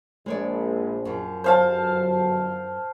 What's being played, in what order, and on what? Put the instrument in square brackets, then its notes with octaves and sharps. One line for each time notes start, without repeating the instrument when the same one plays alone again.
[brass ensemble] A#1 [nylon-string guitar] G#3 C#5 D5
[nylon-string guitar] F#2 F3
[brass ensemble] G1 F#3 [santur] C5 F5 A5